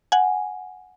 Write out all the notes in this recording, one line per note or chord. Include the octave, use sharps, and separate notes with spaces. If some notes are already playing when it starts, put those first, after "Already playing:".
F#5 G#5